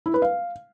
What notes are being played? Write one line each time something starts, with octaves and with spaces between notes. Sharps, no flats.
E4
B4
F5